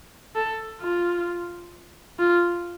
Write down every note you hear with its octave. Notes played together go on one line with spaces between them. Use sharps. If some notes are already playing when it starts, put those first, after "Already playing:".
A4
F4
F4